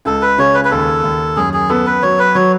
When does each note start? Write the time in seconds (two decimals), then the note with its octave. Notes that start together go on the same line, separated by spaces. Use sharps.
0.05 C#2 A4
0.22 B4
0.38 C#3 C#5
0.54 B4
0.65 B4
0.71 D#2 A4
1.03 D#2
1.36 F#2 G#4
1.53 G#4
1.69 B3 A4
1.86 B4
2.02 F#3 C#5
2.19 B4
2.35 F#3 C#5